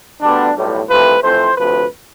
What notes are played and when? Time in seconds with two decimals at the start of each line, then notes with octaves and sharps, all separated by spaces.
0.21 D2 D3 G3 B3 D4
0.55 B1 A2 G3
0.89 C2 C3 F3 A3 C4 B4
1.23 F2 E3 A3 C4 C5
1.56 D2 C3 F3 B4